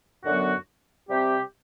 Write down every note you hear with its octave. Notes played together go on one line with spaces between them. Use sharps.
F#2 D3 F#3 B3 F#4
C3 G3 C4 G4